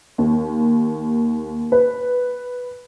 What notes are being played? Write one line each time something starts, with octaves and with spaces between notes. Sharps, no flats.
D#2
B4